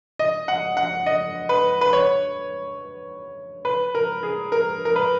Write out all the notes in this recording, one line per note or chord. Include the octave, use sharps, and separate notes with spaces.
D#5
F#5
F#5
D#5
B4
B4
C#5
B4
A#4
G#4
A#4
A#4
B4